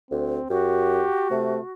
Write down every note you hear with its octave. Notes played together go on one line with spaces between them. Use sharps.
D2 C4
F#2 F#4 G4
C3 A3